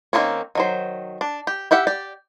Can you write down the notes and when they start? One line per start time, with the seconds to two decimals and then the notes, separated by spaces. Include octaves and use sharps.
0.13 D#3 G#3 A#3 C4 C#4
0.55 D#3 F#3 C5
1.21 D4
1.47 G4
1.71 E4 G4 E5 F#5
1.87 G4 D5